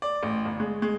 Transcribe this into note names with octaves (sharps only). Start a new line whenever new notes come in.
D5
A1
G1
G#3
G#3